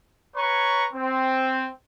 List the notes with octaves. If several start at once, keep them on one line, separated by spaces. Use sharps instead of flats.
B4 C#5 A#5 C#6
C4